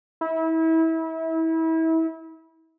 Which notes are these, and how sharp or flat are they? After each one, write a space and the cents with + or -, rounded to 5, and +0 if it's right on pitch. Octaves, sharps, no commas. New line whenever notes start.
E4 -30